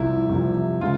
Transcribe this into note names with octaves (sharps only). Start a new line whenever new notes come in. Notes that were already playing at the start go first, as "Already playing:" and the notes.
Already playing: C2 C3 F3 E4
C2 C3 F3
C#3 F3 G#3 F4